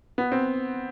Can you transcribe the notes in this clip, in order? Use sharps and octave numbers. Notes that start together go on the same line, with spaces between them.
B3
C4